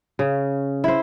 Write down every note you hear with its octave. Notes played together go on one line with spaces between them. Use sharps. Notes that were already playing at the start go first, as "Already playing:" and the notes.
C#3
E4 C5